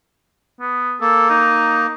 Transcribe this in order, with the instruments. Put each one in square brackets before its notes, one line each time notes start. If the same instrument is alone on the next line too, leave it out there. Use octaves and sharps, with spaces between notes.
[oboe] B3
[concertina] A#3 [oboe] A4
[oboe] D#4